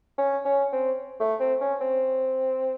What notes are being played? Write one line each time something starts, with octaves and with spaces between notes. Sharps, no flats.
C#4
C#4
C4
A3
C4
C#4
C4